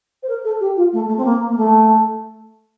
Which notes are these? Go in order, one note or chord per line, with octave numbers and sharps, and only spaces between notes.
C5
A#4
A4
G4
F4
A3
A3
C4
A#3
A#3
A3